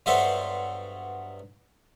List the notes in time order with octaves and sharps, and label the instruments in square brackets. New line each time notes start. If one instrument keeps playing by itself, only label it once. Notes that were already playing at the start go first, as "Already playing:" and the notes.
[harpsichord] G2 F#3 B3 A4 C5 E5